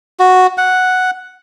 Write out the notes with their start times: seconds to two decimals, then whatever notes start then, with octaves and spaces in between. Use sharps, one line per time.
0.19 F#4
0.58 F#5